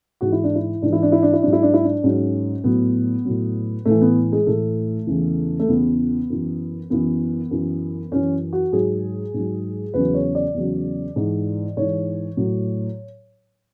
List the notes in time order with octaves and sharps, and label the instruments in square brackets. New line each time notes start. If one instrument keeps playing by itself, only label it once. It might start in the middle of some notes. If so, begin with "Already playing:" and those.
[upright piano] G#2 E3 F#4
E4
D4
E4
G#2 E3 D4
E4
D4
E4
D4
E4
G#2 F#3 D4
E4
D4
E4
D4
G#2 F#3 C#4
A2 F#3 B3
A2 F#3
A2 E3 A3
B3
G#3
A2 E3 A3
E2 C#3 E3
A3
E2 C#3 E3 B3
F#2 E3
F#2 E3 B3
F#2 E3
F#2 E3 C#4
F#4
G#2 F#3 G#4
G#2 F#3
E2 C#3 F#3 B4
C#5
D5
E2 C#3 F#3
G#2 E3
G#2 E3 C#5
A2 F#3